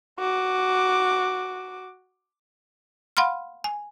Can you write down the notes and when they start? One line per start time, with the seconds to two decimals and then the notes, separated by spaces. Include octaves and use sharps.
0.19 F#4 D6
3.17 F5 F#5 B5 C6 F6
3.64 G#5